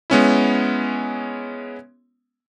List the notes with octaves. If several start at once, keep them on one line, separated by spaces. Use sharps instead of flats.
G#3 B3 C#4 E4